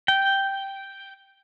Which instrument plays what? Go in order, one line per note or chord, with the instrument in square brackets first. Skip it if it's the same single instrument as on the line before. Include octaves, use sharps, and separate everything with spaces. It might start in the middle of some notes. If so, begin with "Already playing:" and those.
[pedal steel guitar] G5